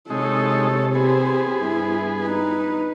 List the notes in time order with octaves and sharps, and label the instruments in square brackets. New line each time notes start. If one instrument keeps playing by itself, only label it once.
[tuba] C3 [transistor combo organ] G#3 D#4 [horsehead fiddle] A4 C#5
[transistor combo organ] B3 G#4 [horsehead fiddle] G4 C5
[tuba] G2 [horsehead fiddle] E4
[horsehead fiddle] D#4 B4